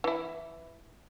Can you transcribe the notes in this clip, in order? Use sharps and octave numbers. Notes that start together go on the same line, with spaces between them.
E3 E4